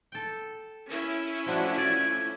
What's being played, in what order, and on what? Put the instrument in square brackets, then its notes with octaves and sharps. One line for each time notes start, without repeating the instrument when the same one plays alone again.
[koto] A4 G5
[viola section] C#4 E4
[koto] F3 A3 D4 [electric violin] F#4
[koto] D5 [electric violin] G#6